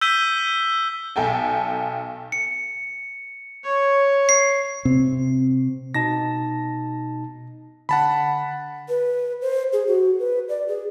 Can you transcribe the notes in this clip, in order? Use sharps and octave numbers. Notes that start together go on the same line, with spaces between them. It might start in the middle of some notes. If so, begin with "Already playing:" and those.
E6 G6 B6 D#7 G7
B1 A4 G5 G#5
C#7
C#5
C7
C3 C4
B2 D#4 A5 A#6
D3 F#5 A5 B5
B4
C5
G#4
F#4
B4
D5
G#4